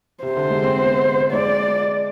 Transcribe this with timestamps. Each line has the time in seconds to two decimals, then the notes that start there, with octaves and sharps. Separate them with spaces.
0.23 C3 C5
0.37 D3
0.50 G#3
0.64 C4
0.78 B3
1.32 G#3 D5